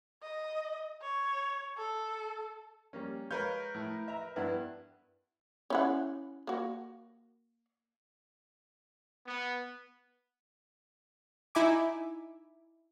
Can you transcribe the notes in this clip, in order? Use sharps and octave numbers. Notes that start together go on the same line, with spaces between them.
D#5
C#5
A4
G3 A#3 C#4
G#3 A#4 B4 C#5 F5 G6
A2
E5 A#5
G2 B3 D4 E4
C#4 E4 F#5
A#3 F#4
B3
D#4 E4 E5 G#5 D6